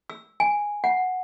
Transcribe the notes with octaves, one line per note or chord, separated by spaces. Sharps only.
E6
G#5
F#5